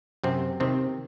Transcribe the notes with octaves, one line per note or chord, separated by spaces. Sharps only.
F#2 C3 C4
C3 D#3 C4